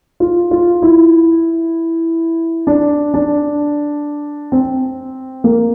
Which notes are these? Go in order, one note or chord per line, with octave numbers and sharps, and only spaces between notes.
F4
F4
E4
D4
D4
C4
A#3